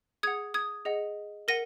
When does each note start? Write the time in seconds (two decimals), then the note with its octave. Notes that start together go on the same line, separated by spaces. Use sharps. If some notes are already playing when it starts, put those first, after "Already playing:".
0.23 G#4 F#5 D#6 G#6
0.54 D#6 G#6
0.85 G#4 D#5 F#5
1.48 A#4 F#5 A#6 D#7